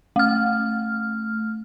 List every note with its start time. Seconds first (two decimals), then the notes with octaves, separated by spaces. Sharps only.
0.16 A3 F6